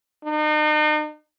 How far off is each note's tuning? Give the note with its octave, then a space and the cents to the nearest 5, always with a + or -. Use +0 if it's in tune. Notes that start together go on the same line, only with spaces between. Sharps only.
D#4 -40